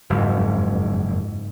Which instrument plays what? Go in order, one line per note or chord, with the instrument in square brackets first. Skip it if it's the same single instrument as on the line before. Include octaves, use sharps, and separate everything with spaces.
[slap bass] F#1 F2 [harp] G#2